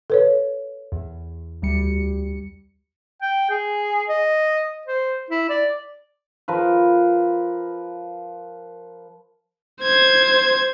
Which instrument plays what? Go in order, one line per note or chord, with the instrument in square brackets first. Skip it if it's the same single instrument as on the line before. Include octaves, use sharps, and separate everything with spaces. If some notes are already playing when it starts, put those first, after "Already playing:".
[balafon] A4 B4 C#5
[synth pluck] E2
D2 G3 C#7
[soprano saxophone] G5
G#4
D#5
C5
E4
D5
[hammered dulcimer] F3 A#4 B4
[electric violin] C5 G#6